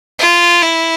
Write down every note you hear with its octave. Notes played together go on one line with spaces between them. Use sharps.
F4
E4